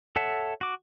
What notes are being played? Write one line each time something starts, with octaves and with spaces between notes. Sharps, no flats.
A4 C#5 E5 F#5 A5
F#4 D6